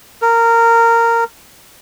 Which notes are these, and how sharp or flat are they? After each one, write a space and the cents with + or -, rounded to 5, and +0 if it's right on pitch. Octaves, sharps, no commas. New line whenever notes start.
A#4 -15